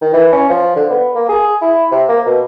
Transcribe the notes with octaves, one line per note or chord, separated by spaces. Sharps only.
D#3
E3
C#4
F3
D3
B3
A#3
G#4
E4
C3
A#3
B2